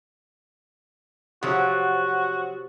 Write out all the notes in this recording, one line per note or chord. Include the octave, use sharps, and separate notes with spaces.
C3 F3 F#3 F#4